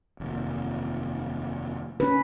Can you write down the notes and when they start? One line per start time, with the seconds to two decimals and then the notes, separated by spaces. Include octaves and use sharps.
0.20 F1 D#2
2.00 C#4 B4